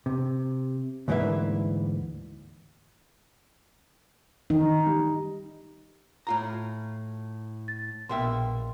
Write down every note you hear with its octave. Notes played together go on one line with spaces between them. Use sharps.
C3
D2 G#2 E3 A#3 B4 E5
D#3 D#4
G3
A2 F4 A#5
A6
A#1 B2 A#3 E5 G5 C6